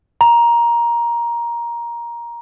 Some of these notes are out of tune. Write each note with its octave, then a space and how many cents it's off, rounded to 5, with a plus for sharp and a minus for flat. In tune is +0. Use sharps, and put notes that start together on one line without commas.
A#5 +15